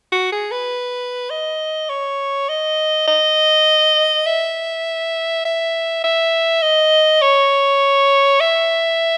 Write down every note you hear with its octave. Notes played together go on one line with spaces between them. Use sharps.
F#4
G#4
B4
D#5
C#5
D#5
D#5
E5
E5
E5
D#5
C#5
E5